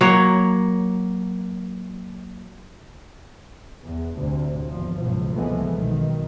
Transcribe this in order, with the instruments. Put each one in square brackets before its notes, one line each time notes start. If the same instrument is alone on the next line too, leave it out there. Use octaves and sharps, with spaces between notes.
[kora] F#3 A#3 C#5
[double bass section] E2
D2 A2 C3
G#1 E2 F3
G#1 C#2 B2 F3 F#3
C2 E3 F3 G#3 A3 B3
B1 D#3